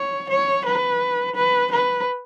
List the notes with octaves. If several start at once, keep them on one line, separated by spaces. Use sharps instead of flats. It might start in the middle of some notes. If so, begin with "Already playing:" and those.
Already playing: C#5
C#5
B4
B4
B4